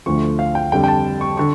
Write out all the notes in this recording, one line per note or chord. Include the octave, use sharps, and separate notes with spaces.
D2 D3 F3 A3 C#6
F5
G5
F2 D3 G3 G5
G5
A5
C#6
D3 C#6